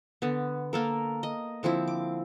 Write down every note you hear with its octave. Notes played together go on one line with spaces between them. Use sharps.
D3 B3
A#3 A4 A#4
D#5
D3 F3 C4 E4
D6